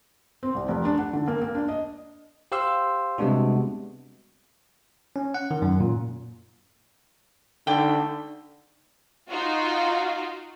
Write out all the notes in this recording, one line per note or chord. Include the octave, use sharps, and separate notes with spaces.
C4
C2
F1
D4
F#5
D3
A#3
A#3
D4
D#5
G4 C5 F5 C6 E6
C3 G3 G#3 B3 D4 F#4
C#4
F#5
D#3
F#2
A#2
D3 D#4 D5 G5
D#4 F4 F#4